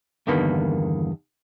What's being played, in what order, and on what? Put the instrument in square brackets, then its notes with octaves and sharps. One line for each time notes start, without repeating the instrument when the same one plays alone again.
[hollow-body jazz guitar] E2 G2 D3 D#3 A#3 B3